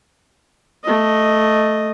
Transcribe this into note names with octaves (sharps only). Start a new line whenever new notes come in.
A3 D#5